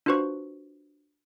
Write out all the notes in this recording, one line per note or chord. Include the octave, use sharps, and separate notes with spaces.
D4 F4 F#4 B4 C5 C#6